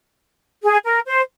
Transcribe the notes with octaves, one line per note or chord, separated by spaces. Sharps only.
G#4
A#4
C5